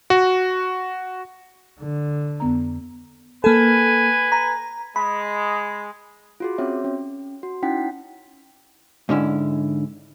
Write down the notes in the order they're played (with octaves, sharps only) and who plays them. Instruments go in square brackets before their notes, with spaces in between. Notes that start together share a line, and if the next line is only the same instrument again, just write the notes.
[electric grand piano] F#4
[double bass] D3
[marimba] F2 B3 A#5
[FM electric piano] A#3 A4 [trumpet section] B4 G#5
[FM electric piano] A#5
[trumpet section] G#3 [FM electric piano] B5
[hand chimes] F4 F#4 G#4
C4 C#4 F#4 C#5 E5
C#4
F#4
C#4 D#4 E4 F#5 G5 B6
[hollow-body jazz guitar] G#2 D3 C#4 E4